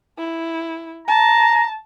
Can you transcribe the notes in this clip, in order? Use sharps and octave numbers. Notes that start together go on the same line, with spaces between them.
E4
A5 A#5